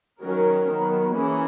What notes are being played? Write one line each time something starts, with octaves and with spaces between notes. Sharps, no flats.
D#3 F#3 C#4 A#4
D#3 F#3 B3
E3 A#3 C#4 G#4